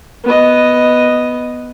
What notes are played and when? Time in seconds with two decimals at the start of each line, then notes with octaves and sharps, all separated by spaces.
0.24 B3 D#5